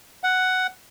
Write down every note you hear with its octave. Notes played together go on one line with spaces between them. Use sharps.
F#5